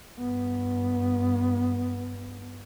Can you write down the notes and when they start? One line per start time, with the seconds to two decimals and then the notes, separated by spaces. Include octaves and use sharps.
0.19 G2 B3